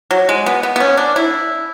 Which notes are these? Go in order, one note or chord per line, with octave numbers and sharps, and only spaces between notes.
F#3
G#3
B3
B3
B3
C#4
D4
E4